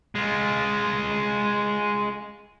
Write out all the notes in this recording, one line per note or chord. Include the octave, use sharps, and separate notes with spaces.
G#3 F4